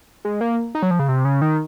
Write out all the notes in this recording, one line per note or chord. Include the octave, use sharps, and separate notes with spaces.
G#3
A#3
D#4
F#3
F3
C#3
C3
C#3
D#3